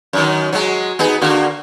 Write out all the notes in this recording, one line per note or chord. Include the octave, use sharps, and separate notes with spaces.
F#2 D#3
F#3 G#3
B3 D#4 G#4
D3 A#3 F#4